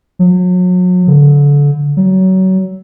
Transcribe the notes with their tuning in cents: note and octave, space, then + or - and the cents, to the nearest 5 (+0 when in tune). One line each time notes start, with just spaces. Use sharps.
F#3 -35
D3 -30
F#3 +25